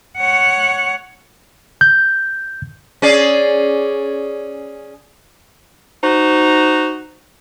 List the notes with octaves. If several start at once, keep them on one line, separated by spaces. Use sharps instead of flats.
C#5 F#5
G6
C#4 G#4 D5
D#4 F#4 C5